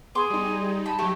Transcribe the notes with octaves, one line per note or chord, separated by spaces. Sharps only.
B3 G#4 C6 D6
G3 D#4
D#5 A5 B5
F#3 A3 G4